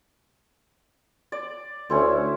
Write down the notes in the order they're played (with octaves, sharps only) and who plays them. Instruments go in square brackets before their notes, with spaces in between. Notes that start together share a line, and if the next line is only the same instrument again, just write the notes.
[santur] D5
[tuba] D2 [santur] C#4 E4 C5